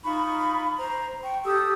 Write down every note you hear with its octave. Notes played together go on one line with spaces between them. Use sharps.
D#4 F4 B5 C#6
C5 A#5
G5 C#6
G4 A4 D#6 E6